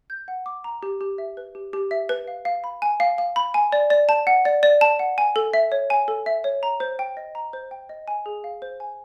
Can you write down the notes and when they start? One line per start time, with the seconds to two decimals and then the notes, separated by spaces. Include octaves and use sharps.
0.10 G6
0.28 F#5
0.46 D6
0.64 A#5
0.83 G4
1.01 G4
1.18 E5
1.37 B4
1.55 G4
1.73 G4
1.91 E5
2.09 B4
2.28 F5
2.45 F5
2.64 B5
2.82 G#5
3.00 F5
3.18 F5
3.36 B5
3.54 G#5
3.72 D5
3.90 D5
4.09 A5
4.27 F#5
4.45 D5
4.63 D5
4.81 A5
4.99 F#5
5.18 G#5
5.36 A4
5.54 E5
5.72 C#5
5.90 G#5
6.08 A4
6.26 E5
6.44 C#5
6.63 A#5
6.80 C5
6.99 G5
7.17 D#5
7.35 A#5
7.53 C5
7.71 G5
7.89 D#5
8.08 G#5
8.26 G#4
8.44 F5
8.62 C5
8.80 G#5